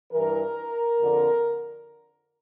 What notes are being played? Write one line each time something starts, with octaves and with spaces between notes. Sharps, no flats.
G2 E3 A#4
F2 D3